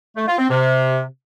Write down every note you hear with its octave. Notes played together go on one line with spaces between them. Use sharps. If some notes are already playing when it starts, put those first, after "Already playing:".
A3
F4
C4
C3